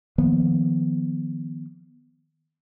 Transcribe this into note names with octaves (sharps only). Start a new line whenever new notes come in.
D#3 F3 A#3 B3